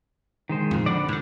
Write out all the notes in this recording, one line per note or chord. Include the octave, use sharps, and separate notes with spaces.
D#3 G#3 C5
F2 A#2
D3 D5 F#5 B5
G#2 D3